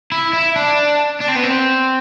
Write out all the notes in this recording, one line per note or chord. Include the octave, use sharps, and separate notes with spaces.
E4
E4
D4
D4
C4
B3
C4